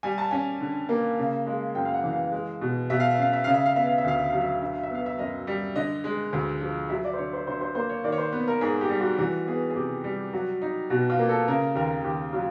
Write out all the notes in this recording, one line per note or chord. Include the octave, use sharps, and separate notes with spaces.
G3 G#5
A5
C#4 G#5
D3
A#3
C#3
G#3
F#2 G5
F5
F#5
E3
F5
G#3
B2
B2 E5
F5
E5
C#4 F5
E5
C#3 F5
E5
F5
B3 E5
F5
E5
D2 F5
E5
F#3 F5
E5
F5
D3 E5
F5
E5
B3 F5
E5
F#2 D#5
G3
D3 D#5
G#3
D2
F3
F#3 E5
D5
C5
D3 C#5
C5
D3 C5
C5
A#3 C5
C#5
D#3 D5
C#5
C5
B3 B4
A#4
G#2 G#4
G4
G3
F#4
E3 F#4
B3 G#4
G#4
C3 G4
G3
F#3 F#4
D#4
B2 F#4
F4
A#3
A4
C#3 A#4
D#2 A#4
D#2 G4
F#3 F4